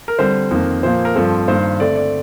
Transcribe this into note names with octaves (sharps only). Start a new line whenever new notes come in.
A#4
D3 G3 C4 C5
F2 D#3 A#3
A#2 F3 A#3 C5
A#4
G2 F3 C4 A4
G2 D#3 A#3 C5
D3 A3 C4 D5
D5